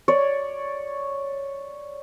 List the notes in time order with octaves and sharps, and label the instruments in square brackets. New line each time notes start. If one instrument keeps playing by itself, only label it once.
[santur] C#5 D5